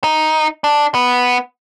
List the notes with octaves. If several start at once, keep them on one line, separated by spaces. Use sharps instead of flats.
D#4
D4
B3